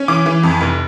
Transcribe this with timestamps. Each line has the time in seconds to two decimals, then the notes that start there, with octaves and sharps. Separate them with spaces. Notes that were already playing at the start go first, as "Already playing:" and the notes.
Already playing: C#4
0.08 E3 D6
0.26 E3
0.43 F2
0.61 F1